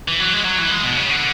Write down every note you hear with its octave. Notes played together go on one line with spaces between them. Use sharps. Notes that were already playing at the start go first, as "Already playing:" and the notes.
E3
F#3
G#3
F#3
E3
G#3
B2
C#3
D3